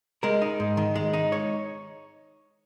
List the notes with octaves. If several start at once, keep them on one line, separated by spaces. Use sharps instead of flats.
G#3 A#4
D#4
G#2
D#3
G#3
D#4
C#5